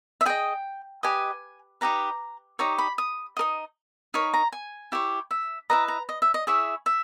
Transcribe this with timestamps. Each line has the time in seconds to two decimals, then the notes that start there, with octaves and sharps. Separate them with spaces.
0.21 E5
0.26 G#4 D#5 G5
1.03 G4 B4 D#5 G#5
1.81 D#4 G4 B4 A#5
2.59 D#4 G4 C#5 A#5
2.78 B5
2.98 D#6
3.37 D#4 A#4 D#5
4.14 D#4 A#4 C#5 B5
4.34 A#5
4.52 G#5
4.92 E4 G4 C#5
5.31 E5
5.70 E4 G#4 B4 D#5 A#5
5.88 A#5
6.09 D#5
6.22 E5
6.34 D#5
6.47 E4 G#4 C#5 E5
6.86 E5